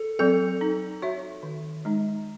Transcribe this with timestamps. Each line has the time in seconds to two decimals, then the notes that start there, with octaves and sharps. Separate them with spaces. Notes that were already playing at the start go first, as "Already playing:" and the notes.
Already playing: A4
0.19 F#3 C4 A4
0.61 D#4
1.02 F#4 C#5 E5
1.43 D#3
1.85 G#3 D#4